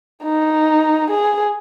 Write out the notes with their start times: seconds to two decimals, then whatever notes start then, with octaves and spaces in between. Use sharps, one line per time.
0.24 D#4
1.10 G#4